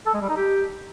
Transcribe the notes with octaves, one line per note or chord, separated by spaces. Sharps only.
A4
G#3
G3
D#4
G4